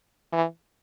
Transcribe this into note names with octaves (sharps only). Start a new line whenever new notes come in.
E3